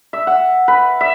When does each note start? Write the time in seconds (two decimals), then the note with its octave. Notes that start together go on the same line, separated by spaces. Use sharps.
0.13 E5
0.27 F#5
0.68 B4
1.01 E5